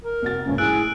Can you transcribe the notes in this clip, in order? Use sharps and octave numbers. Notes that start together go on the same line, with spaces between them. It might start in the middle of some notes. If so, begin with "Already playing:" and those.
A#4
C2 F#4 A6
C#2 G2 A#2 C#4
A2 E3 G#4 G#5 E6 F#6 D7